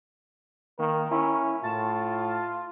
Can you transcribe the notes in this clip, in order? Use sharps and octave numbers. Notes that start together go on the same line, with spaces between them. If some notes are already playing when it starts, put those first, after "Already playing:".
D#3 A#3 A#4
C#4 E4
A2 F4 A5